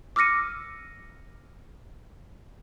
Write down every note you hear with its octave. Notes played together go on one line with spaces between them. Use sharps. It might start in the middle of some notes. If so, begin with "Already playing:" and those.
D6 E6 F6 A#6 C#7 D#7